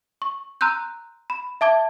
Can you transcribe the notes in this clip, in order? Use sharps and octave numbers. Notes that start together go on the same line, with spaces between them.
C#6
A#5 C6 E6 F#6 G6
B5
E5 A5 D6 G#6